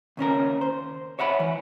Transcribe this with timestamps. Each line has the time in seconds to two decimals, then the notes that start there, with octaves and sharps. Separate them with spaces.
0.17 D#2 C#3 C#4 A#4
0.61 C5
1.19 C#5 E5 F#5 B5
1.40 E3